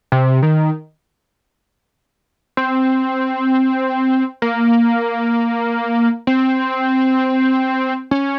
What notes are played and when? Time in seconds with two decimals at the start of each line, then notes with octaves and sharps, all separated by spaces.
0.12 C3
0.43 D#3
2.57 C4
4.42 A#3
6.27 C4
8.11 C#4